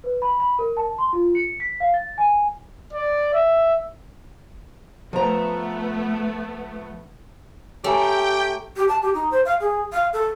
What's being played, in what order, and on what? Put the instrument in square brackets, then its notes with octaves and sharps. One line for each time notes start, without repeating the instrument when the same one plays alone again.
[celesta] B4
B5
B5
A#4
A5
C6
F4
C#7
B6
F5
A6
G#5
[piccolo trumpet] D5
E5
[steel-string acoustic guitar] F3 A#5 [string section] A3 B3
[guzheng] A3 [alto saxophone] G4 [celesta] C#5 G#5 A#5 [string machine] G5
[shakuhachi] G4
A5
G4
D#4
C5
F5
G#4
F5
A4